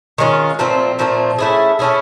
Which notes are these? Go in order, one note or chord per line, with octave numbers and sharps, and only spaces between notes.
D#3 G#3 C#4 F4
A#2 F3 A3 C4
A#2 F3 A3 C4
A3 C#4 E4 G#4
A3 C#4 E4 G#4